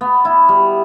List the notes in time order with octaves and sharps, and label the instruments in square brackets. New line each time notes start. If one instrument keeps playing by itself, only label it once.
[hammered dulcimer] B3
E4
G3